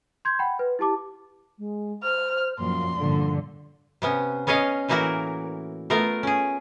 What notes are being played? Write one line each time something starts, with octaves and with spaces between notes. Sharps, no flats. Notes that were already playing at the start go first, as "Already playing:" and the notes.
C6 G6 G#6
F#5 G5 B5
B4
E4 G4 A5 D6
G#3
C5 F6
F#2 A#2 F3 C6
G2 A#2 D3 F3
C3 B3 C#4
B3 C#4 C#5 D#5 F5
A2 E3 A#3 E4 F#4 A#4
A3 B3 F4 A#4
C#4 G#4